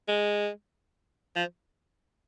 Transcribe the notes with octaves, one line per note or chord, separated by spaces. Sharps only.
G#3
F3